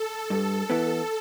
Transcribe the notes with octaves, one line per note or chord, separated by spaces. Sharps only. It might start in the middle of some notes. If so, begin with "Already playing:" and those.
Already playing: A4
G2
E3 B3